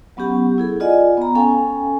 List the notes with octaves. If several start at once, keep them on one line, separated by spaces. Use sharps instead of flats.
F#3 B3 C#4 G4 F#5
E4 G#4 A4
F4 D5 D#5 F#5 G#5
B3 A#5
C#4 A4 F5 G5 G#5